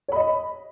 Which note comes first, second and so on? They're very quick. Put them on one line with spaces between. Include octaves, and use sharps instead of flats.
C#5 B5 D#5